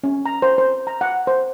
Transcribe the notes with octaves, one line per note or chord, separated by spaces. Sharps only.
C#4
A#5
C5
C5
A#5
F#5
C5